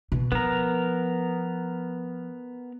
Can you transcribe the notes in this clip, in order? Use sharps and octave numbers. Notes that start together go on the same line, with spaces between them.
B2
F3 B3 A#4